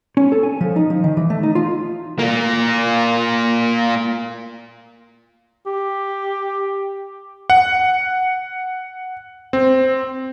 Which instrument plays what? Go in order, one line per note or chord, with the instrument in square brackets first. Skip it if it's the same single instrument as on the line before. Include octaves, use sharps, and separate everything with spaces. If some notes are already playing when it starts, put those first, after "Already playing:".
[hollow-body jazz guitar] C#4
A4
G#5
F3
D#4
F3
D#3
E3
A3
D#4
F4
[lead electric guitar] A#3 F4
[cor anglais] G4
[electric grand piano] F#5
C4